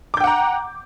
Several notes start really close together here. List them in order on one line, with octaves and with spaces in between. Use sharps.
D6 G6 G5 F#5 A#5